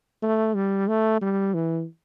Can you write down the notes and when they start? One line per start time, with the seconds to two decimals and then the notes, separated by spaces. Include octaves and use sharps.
0.22 A3
0.55 G3
0.88 A3
1.22 G3
1.54 E3